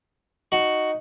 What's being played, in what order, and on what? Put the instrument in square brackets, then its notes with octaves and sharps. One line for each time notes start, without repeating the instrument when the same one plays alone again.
[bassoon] D#4 [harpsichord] F#4